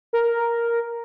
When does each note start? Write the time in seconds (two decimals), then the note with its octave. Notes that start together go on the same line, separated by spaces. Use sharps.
0.13 A#4